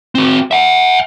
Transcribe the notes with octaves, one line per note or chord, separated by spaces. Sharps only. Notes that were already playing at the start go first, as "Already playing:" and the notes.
C4 F#4
E5 F#5